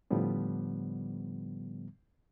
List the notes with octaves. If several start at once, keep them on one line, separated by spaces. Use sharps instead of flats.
A2 D3 F3 G3 B3